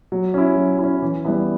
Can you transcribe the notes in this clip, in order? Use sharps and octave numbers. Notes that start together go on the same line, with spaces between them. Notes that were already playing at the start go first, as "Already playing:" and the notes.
F#3
C#4 E4
F#3
C#4 E4
E3
G3 B3 E4